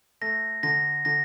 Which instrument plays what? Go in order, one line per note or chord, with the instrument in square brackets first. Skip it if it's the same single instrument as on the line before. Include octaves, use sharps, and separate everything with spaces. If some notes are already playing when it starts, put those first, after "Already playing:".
[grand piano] A3 [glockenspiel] A#6
[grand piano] D3 [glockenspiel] A#6
[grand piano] D3 [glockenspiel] A#6